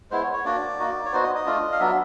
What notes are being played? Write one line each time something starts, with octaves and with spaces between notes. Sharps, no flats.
G#3 B3 E4 C5
C#5
C#5
A#3 D4 F#4 D5
A#3 D#4 F#4
C#5
B3 D#4 F#4 C5
D#5
D#5
A3 D4 F4
F5
F#3 B3 D4 E5